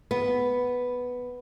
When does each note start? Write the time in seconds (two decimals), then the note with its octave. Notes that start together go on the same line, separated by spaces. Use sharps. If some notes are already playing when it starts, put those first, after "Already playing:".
0.11 B3